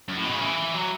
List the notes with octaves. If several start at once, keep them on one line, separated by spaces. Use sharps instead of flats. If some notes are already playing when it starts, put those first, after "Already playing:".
F#2
A2
B2
C#3
E3
F#3